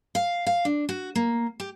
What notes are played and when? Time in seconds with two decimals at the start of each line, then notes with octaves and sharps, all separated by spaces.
0.15 F5
0.47 F5
0.65 D4
0.89 F#4
1.15 A#3
1.60 G4